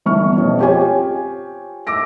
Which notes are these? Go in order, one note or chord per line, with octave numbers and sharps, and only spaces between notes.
G1 E3 B3 C#6 F6
F2 B2 C#4
C4 F4 G4 C#5 G#5
D6 E6 A#6 D7